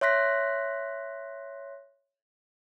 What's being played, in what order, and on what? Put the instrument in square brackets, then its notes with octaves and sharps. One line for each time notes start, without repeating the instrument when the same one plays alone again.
[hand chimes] C#5 E5 C6 F#6 A#6 B6